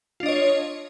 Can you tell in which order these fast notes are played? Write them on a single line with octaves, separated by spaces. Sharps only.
F4 D4 D#5 C#5